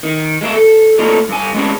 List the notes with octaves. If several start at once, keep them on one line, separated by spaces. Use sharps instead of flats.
D#3
G#3 A#3 E5
A4
A3 A#3 D4 D#4 F4 A4
G2 G#5
G#3 B3 C#4 D4 G#4